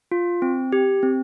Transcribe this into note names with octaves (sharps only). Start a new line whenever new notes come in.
F4
C4
G4
C4